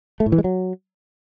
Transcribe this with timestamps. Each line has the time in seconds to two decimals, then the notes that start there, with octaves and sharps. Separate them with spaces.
0.20 A3
0.26 A2
0.32 E3
0.38 G#3
0.44 F#3